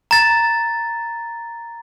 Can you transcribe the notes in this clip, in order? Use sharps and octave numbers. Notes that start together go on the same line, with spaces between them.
A#5 A6